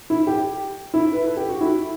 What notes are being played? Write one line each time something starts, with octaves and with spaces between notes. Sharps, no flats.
E4
G4
E4
B4
A4
G4
F#4
E4